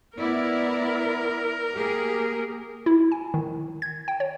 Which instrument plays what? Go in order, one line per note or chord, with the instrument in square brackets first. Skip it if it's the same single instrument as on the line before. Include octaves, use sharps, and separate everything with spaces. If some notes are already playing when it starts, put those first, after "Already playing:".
[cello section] B3 E4 D5 [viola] A#4
[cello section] A#3 G4 G#4
[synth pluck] E4
G#5
D#3
G#6
G5
C#5